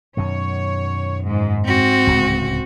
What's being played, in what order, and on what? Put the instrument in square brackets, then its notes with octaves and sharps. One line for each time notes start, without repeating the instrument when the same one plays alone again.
[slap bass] F#2 B2 D#3 [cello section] C#5
[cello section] G#2
[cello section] G#2 [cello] C4 F#4
[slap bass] D1 C#2 C#3